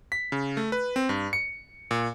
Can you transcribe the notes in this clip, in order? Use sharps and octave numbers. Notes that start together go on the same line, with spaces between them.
B6
C#3
A3
B4
C4
G2
C#7
A#2